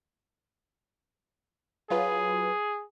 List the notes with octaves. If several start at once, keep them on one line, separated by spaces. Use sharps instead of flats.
F#3 F4 G#4 B4